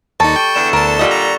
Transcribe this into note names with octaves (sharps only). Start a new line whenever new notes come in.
D#2 G3 D#4 A4 A5 C#6 A6 C#7
G5 C#6 A6 G7
E2 D3 E7
D2 A#4 A5
A#2 D3 G3 F4 D#5
A#5